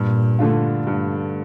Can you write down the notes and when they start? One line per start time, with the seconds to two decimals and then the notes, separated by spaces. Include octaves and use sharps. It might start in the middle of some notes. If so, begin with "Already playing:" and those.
Already playing: G2 A#2
0.39 D3 A3 D4 F4
0.87 G2